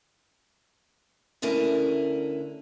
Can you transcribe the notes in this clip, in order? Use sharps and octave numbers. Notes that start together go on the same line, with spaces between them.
D2 D3 C#4 E4 A#4